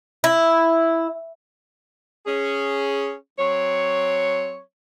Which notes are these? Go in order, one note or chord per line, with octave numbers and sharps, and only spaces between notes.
E4
C#4 G#4
F#3 C4 C#5